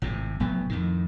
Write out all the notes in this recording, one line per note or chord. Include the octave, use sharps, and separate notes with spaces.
G#1 A2 C3
F1 A2 F#3 B3
F2 A2 D#3